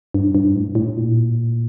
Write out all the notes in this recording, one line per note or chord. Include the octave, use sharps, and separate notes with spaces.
G2
G2
A2
A2
A#2